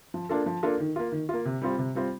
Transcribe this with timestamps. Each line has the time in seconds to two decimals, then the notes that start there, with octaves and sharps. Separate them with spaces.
0.14 F3
0.29 A#3 D4 F4 A4
0.46 F3
0.63 A#3 D4 F4 A4
0.80 D#3
0.96 A#3 F4
1.12 D#3
1.29 A#3 F4
1.45 C3
1.62 G3 C4 F4
1.78 C3
1.95 G3 C4 F4